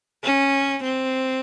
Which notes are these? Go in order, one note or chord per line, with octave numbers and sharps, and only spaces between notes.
C#4
C4